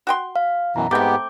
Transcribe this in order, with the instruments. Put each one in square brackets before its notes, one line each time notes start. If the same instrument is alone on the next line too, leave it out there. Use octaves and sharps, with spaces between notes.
[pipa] F#4 G5 C6
[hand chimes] F5
[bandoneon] F#2 B2 E3 [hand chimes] A#5
[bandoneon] G#2 B3 G4 [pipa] A3 C4 [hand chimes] D6 G6